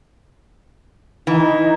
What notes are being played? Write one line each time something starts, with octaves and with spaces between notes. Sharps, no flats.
E3 D#4